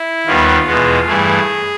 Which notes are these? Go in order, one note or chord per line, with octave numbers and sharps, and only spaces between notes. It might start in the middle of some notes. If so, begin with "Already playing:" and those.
Already playing: E4
D#2 D#3 G3 B3 F4
E2 B2 G#3 B3
G2 E3 A3 G#4